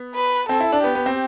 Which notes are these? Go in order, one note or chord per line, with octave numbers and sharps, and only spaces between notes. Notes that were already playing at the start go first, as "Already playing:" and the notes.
Already playing: B3
B4
C4 A4
E4
D4
B3 G4
B3
C4